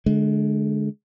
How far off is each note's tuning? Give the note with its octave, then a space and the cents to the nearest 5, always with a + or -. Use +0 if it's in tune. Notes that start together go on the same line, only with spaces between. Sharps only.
D3 +0 G#3 +30